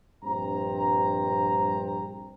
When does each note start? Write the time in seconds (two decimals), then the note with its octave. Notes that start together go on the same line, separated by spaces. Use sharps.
0.24 A#1 G2 C4 A#5